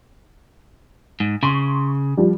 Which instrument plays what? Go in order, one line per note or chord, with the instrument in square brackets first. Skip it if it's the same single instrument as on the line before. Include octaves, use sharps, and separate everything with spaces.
[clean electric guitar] G#2
[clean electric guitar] C#3 [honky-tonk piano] C6 C#6
[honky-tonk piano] F3 G3